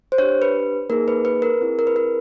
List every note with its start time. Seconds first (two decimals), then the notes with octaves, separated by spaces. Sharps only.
0.12 C5
0.18 D4 G4 C#5
0.42 B4
0.90 A#3 D#4 G#4 A#4
1.08 B4
1.25 B4
1.42 A#4
1.61 C4 E4 G#4
1.79 A#4
1.87 B4
1.96 A#4